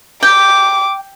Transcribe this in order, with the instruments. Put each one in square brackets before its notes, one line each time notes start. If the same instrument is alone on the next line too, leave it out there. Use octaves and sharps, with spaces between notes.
[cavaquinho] G5 [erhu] D6